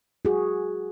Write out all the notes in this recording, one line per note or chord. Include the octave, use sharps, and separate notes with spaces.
F#4 G#4